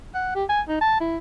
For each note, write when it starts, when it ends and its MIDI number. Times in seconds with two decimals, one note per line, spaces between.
0.14 0.35 78
0.35 0.44 67
0.49 0.61 80
0.68 0.79 63
0.81 0.97 81
1.00 1.17 64